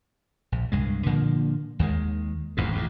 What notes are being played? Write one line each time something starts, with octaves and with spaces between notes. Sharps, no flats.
A#1
C2 G2 G#3
A#2 D3 F3 A#3
D#2 D#3 G#3
D#1 A1 E2 G#2
A1 F2 G#2